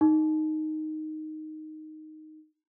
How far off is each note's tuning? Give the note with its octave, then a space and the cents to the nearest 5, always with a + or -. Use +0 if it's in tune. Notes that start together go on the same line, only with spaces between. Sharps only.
D#4 +0